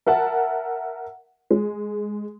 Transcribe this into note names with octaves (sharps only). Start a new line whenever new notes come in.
A#4 E5 F#5 A5
G#3